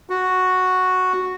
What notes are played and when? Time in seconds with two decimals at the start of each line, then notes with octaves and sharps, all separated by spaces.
0.10 F#4